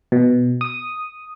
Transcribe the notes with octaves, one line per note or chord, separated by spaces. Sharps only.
B2
D#6